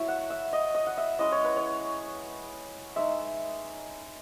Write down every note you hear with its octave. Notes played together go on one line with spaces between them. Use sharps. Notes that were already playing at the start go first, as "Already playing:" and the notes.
Already playing: F#3 A3 E4 C#5 E5
F#5
E5
D#5
D#5
F#5
E5
G#3 C#4 E4 D#5
C#5
B4
C#5
G#3 D#4 E5